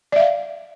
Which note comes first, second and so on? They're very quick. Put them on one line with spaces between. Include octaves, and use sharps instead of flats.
D5 E5 F5